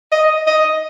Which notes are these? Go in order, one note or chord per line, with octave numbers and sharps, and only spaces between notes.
D#5
D#5